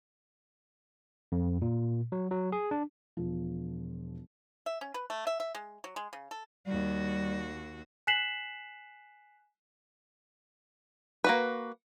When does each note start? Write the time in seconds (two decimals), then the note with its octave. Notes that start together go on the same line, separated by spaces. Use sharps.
1.32 F2
1.62 A#2
2.12 F#3
2.31 F#3
2.52 G#4
2.71 D4
3.17 E1 F3
4.66 E5
4.81 C#4
4.94 B4
5.10 A3
5.27 E5
5.40 E5
5.55 G#3
5.84 F#3
5.96 G#3
6.13 C#3
6.31 A4
6.67 D#2 G3 F#4
8.07 G#5 F#6 B6 C7 E7 F#7
11.24 A#3 F#4 B4